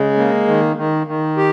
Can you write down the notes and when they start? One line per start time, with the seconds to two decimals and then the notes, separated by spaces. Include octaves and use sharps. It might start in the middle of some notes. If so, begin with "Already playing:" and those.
Already playing: C#3 G#3
0.17 A#3
0.47 D#3
0.77 D#3
1.07 D#3
1.37 G4